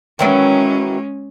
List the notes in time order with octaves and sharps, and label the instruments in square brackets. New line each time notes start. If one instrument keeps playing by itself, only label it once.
[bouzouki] D#3 E3 F#3 [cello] G#3 C#4